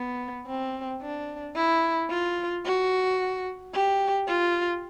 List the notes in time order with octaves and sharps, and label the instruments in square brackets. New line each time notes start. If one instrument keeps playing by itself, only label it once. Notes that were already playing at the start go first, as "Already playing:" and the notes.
Already playing: [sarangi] B3
C4
D4
E4
F4
F#4
G4
F4